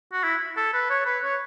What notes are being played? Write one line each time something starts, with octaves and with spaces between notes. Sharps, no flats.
F#4
E4
A4
B4
C#5
B4
C#5